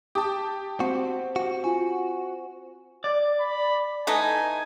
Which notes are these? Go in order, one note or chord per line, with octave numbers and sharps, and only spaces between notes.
G4 A5 D6 D#6
C4 F#4
F#4
F4 F#4 G#5
D5
B5
E3 A3 D#4 G#5